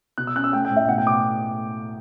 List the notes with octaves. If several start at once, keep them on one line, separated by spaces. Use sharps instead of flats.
B2 F#6
E6
C#4 F#6
E6
A3 G5
G5
A2
E5
B2 F#5
G5
B2 D6